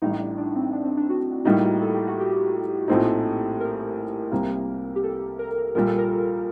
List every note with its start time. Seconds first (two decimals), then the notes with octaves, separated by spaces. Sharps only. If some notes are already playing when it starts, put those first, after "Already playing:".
0.02 A1 A2 G3 D#4
0.20 D4
0.38 D4
0.55 C4
0.73 D4
0.85 C4
0.97 D4
1.09 F#4
1.45 A2 G3 A#3 D#4 F#4
1.81 A4
1.94 G4
2.07 F#4
2.20 G4
2.88 A#1 A2 A3 C4 D#4
3.60 A#4
4.31 C2 C3 G3 A#3
4.96 G4
5.03 A4
5.39 A#4
5.75 A#1 A#2 G3 A#4
5.87 A4
5.98 A#4